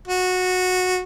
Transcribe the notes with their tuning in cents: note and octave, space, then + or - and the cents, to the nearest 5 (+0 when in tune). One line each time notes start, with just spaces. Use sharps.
F#4 -15